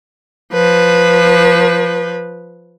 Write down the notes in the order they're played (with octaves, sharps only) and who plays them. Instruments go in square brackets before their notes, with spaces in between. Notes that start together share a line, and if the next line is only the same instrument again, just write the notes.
[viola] F3 B4